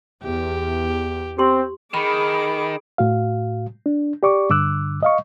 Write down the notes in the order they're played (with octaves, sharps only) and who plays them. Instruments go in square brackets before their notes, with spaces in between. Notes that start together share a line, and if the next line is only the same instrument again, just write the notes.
[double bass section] E2 [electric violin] G4
[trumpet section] C4 [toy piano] G4 C6
[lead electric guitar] D#3 [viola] G#4 D6 [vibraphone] B5
[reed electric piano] A2 F#4 F5
D4
G4 D5 C#6 D6
G2 D3 D6 E6 F#6
D#5 F5 C#6